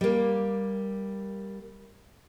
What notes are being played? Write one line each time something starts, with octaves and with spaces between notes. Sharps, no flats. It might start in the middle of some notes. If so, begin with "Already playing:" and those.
G3 A#3